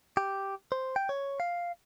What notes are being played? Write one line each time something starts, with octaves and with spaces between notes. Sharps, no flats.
G4
C5
G5
C#5
F5